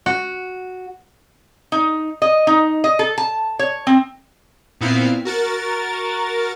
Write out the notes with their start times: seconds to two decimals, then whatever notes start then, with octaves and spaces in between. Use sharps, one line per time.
0.06 F#4
1.72 D#4
2.22 D#5
2.47 D#4
2.84 D#5
2.99 A4
3.18 A5
3.59 C#5
3.87 C4
4.81 A#2 B3 C4 E4 F5
5.25 F#4 A#4 A6